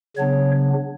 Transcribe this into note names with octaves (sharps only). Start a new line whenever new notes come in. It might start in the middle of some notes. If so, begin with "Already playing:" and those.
C#3 F#3 B3 D4 C#5